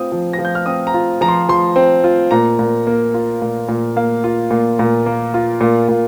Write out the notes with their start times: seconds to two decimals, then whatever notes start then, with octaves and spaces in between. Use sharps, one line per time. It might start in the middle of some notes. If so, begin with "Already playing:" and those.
Already playing: C4 F4 D#6
0.12 F3
0.33 A#6
0.39 F3
0.45 G6
0.55 F6
0.66 C4 D#6
0.87 A#5
0.94 F4
1.21 F3 A#5
1.28 C6
1.49 F3 C6
1.76 C4
2.04 F4
2.31 A#2 A#5
2.59 A#2
2.87 A#3
3.14 F4
3.42 A#2
3.69 A#2
3.96 A#3 F5
4.24 F4
4.51 A#2
4.79 A#2
5.06 A#3
5.34 F4
5.61 A#2
5.89 A#2